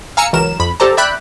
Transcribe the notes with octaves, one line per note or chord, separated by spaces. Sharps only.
F5 G#5 A#5 E6 C#7
C#2 E3 F#3 A#4 E7
F2 B5
G4 A4 C5 D5 A5 A#5
D5 E5 G5 B5 F#6